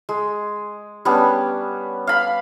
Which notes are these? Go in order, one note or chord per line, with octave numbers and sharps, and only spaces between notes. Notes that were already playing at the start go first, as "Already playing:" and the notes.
G#3
G3 B3 C#4 D4
F5 B5